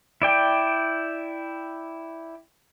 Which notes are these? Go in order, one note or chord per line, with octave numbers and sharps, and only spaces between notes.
E4 D5 G5